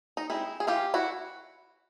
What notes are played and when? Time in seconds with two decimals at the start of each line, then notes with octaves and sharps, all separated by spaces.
0.17 D#4
0.30 G#3 C4 D#4 E4
0.60 G#4
0.67 E3 F4 G4
0.94 E4 F#4